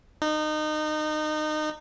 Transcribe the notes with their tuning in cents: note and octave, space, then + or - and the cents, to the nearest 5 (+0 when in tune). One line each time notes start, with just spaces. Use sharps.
D#4 -25